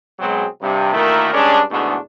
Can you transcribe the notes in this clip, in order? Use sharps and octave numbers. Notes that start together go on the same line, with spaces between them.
B2 F#3 G#3 C4 G#4
G2 C3
D2 D#3 A3 A#3 E4 A#4
G2 G#3 C#4 D4
E2 G#2 B2 D3 A3 D4